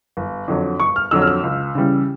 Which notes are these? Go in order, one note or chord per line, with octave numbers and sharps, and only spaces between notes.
G1
F2 D3 F#3
G1 C#6
F6
F2 D3 F#3 E6
F6
E6
C#2
C#3 E3 G3